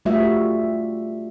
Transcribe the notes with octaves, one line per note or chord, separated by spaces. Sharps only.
G3 A3 F4 F#4 E5